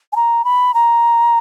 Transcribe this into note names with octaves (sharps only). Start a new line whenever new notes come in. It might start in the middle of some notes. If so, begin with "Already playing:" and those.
G#5
A#5
B5
A#5